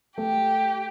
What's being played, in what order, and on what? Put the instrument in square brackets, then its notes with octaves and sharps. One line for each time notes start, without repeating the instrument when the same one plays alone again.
[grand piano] A3 [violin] G4